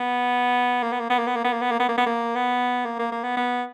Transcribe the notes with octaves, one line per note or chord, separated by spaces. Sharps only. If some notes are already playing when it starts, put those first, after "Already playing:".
Already playing: B3
A#3
B3
A#3
B3
A#3
B3
A#3
B3
A#3
B3
A#3
B3
A#3
B3
A#3
B3
A#3
A#3
A#3
B3
B3